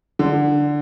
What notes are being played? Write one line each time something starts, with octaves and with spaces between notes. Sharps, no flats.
D3